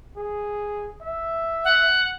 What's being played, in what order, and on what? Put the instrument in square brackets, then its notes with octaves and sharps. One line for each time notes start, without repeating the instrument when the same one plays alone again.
[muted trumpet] G#4
E5
[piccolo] F#5